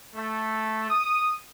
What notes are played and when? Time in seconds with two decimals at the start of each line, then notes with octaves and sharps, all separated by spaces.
0.15 A3
0.90 D#6